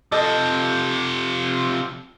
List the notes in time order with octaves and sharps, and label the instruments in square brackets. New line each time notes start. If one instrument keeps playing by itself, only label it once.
[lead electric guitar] C3 F3 [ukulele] A4 D#5